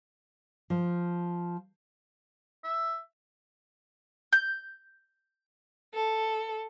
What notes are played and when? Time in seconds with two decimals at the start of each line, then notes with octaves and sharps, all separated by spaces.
0.70 F3
2.64 E5
4.33 G6
5.94 A4